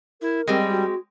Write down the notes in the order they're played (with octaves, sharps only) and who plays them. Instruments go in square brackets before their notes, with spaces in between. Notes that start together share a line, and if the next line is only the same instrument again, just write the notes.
[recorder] E4 [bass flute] A#4
[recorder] G3 [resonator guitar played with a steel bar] G#3 C4 G4
[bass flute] F#4